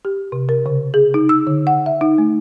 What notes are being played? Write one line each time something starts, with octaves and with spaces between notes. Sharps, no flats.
G4
C3
A#4
C#3
G#4
D#4
E6
D3
F#5
E5
D#4
A3